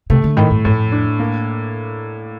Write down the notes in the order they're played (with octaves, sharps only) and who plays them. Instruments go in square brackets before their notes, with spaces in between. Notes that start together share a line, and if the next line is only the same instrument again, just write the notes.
[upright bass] C3 [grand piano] A3
[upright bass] D3
[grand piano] A2 [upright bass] D#3
[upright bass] G2
[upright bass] F2 [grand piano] A2
[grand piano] D4
A#3